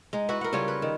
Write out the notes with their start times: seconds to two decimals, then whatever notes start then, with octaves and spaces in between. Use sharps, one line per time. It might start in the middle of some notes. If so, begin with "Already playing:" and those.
0.13 G#3 D#4
0.29 E4 F#4 B4
0.41 A#4 F#5
0.53 C#3 G3 F4 C#5
0.68 B4
0.82 D#3